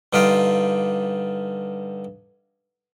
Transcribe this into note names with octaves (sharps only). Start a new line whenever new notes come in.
G2 D3 D#4 F4 G4 F5